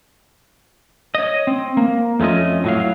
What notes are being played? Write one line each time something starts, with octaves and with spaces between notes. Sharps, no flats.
C#5 D#5
C4
A#3
F2 A3 C#4 F4 D#5
A2 F#3 F5